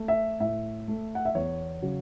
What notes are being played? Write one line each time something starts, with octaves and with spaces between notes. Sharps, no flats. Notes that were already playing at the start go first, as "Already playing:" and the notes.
Already playing: A3
E5
A2 E5
A3
F#5
E5
E2 C#5
C#3 F#3